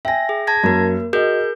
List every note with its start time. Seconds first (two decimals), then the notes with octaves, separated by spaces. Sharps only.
0.05 E5 G5 G#5 A#6
0.29 G#4
0.47 A5 G#6 A#6
0.63 F#2 A#3 A#4
1.13 F#4 G#4 A#4 D#5 G6